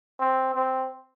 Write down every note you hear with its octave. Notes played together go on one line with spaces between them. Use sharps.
C4
C4